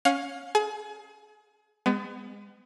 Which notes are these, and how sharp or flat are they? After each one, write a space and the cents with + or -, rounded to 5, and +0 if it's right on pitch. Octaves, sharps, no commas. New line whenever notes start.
C#4 +0 F5 +30
G#4 +30 G#5 +35
G#3 -30 B3 +30